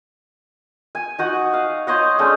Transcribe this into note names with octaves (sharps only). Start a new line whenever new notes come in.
G#5
D#4 F#4 F#5
F5
C5 C#5 D#5 F#5
G#3 A3 C#4 D4